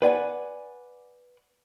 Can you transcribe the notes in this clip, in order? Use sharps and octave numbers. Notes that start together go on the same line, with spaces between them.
B4 D5 F#5 G#5